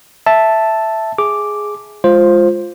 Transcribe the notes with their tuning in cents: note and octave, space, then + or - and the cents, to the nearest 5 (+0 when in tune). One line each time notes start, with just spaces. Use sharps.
E5 +0 A5 +0
G#4 +5 D6 +0
G#3 +0 F4 +0 C5 +10